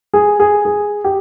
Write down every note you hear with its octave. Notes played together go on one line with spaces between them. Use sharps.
G#4
G#4
G#4
G4